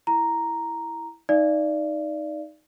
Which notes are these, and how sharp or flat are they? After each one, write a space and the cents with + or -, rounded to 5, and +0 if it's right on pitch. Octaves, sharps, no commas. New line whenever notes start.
E4 +0 A#5 +0
D#4 +0 D5 +0 F5 -40